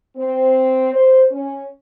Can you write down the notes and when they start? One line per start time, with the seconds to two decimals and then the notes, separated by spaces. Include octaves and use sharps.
0.16 C4
0.93 C5
1.31 C#4